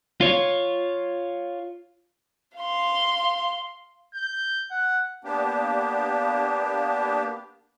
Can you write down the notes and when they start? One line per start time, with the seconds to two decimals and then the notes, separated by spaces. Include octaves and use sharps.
0.21 F4 C#5
2.58 F5 C6
4.14 G6
4.70 F#5
5.24 A#3 B3 D4 G4